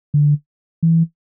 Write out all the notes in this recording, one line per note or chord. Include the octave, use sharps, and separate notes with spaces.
D3
E3